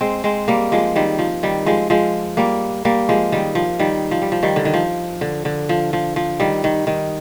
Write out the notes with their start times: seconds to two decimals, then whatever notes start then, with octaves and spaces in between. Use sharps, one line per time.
0.01 G#3 C4
0.24 G#3 C4
0.48 G3 A#3
0.72 F3 G#3
0.96 D#3 G3
1.19 F3
1.43 D#3 G3
1.66 F3 G#3
1.90 F3 G#3
2.37 G3 A#3
2.85 G3 A#3
3.09 F3 G#3
3.32 D#3 G3
3.55 F3
3.79 D#3 G3
4.11 F3
4.22 G3
4.32 F3
4.43 D#3 G3
4.56 D3
4.65 D#3
4.74 F3
5.21 D3
5.45 D3
5.69 F3
5.93 F3
6.16 F3
6.40 D#3 G3
6.64 D#3
6.87 D#3